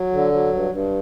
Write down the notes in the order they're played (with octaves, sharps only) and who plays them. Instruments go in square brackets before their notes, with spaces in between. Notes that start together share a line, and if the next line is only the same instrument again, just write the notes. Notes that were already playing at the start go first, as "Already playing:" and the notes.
Already playing: [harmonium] F#3
D3
F#3
G2
G2